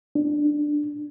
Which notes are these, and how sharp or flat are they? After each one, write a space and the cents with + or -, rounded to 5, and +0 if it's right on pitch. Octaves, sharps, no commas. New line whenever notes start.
D4 +10